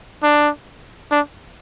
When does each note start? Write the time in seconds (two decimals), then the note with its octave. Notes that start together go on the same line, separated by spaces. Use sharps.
0.23 D4
1.11 D4